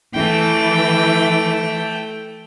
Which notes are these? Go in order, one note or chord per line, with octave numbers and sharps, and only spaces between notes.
E3 A3 G5